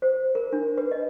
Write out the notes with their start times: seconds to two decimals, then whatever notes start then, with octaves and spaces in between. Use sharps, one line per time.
0.02 C5
0.35 A#4
0.52 D4
0.78 B4
0.91 D#5